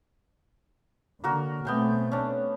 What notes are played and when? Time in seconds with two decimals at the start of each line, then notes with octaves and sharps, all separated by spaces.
1.24 D3 A#3 F#4 A#4
1.65 B2 A3 B3 C4 G5 G#5
2.12 C#4 D4